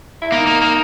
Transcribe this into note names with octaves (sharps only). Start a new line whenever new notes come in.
E4
A#3 D#4
A#3
A#3